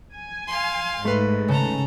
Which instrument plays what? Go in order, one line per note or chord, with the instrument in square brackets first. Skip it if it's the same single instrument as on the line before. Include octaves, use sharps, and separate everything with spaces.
[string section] G#5
[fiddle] F5 C6
[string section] G#2 [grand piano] A3 B4
[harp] C#3 [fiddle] A4 A#5